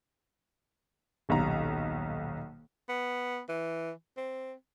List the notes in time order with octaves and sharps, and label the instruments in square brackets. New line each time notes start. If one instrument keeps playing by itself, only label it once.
[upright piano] D#1 B1 F5 A#5
[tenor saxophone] B3
E3
C4